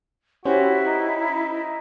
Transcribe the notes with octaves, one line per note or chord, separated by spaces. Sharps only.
C#4 E4 F#4 G4 C5
D#4